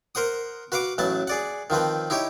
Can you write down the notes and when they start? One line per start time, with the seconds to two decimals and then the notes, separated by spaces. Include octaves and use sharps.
0.15 A#4 C5 F#5 D#6
0.72 F#4 B4 F5 F#5 D6
0.98 A1 F#3 B4 A5
1.27 G#4 D5 F#5
1.70 D#3 F3 C4 B4
2.10 D#4 E4 G4 C#5